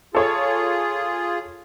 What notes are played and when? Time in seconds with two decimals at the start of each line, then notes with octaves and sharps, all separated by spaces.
0.15 F4 G#4 A4 C#5